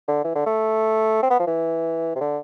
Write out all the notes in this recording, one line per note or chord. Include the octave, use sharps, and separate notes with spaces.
D3
E3
D3
A3
C4
B3
F3
E3
C3
D3